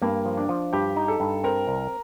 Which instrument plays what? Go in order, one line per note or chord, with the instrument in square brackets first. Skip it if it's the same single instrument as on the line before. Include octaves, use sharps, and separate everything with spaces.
[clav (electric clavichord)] G2 [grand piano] A#3
[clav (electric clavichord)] F3
[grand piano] D4
[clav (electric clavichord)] F3
[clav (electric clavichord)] G2 [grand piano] G4
[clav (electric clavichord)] D#4
[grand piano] A4
[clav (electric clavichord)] G2
[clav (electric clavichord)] C4 [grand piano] A#4
[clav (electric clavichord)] C2